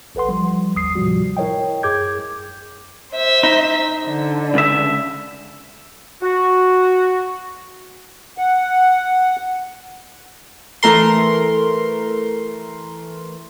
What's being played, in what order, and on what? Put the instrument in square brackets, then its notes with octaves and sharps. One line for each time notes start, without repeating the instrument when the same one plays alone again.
[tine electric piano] A1 A4 B4 F#5 C6
F3 G3
G1 D#2 D#6 C7
A2 C3 F3 G3 F#4
E4 A#4 C#5 D#5 G5
F#2 G#4 D6 G6 G#6
[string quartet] C5 E5
[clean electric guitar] D#4
[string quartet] D3
[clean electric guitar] C#2 E5
[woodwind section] F#4
[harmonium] F#5
[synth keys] E3 A3 A#4 C6